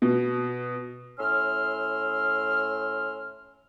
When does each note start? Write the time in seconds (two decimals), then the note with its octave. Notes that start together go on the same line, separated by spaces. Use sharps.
0.02 B2
1.18 A2 C#4 C6 E6 F6